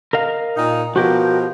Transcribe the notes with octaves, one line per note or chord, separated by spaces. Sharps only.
A#4 D#5 F5
A#2 D#4
B2 F3 F#4 G4 A#4